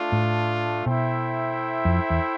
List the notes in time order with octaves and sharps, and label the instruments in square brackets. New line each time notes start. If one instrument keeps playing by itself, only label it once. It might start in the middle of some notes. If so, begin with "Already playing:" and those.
Already playing: [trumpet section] A3 D4 F4
[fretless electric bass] A2
[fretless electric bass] B2 [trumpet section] E4 A4 C5 E5 G5
[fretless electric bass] F2
E2